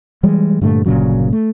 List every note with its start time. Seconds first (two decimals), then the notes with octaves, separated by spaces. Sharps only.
0.23 E3 G3 G#3
0.61 G2 A#2 D3 A3
0.86 G1 A#2 C#3 F#3
1.33 A3